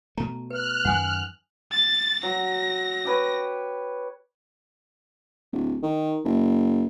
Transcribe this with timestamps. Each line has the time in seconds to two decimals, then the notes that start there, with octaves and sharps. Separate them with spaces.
0.18 B2 A3 A#5
0.50 B4 F6 F#6
0.85 F#2 D#3 F#5 G#5 D#6
1.71 A6
2.23 F#3 A#6
3.05 G4 B4 C#5
5.52 D1
5.83 D#3
6.24 F#1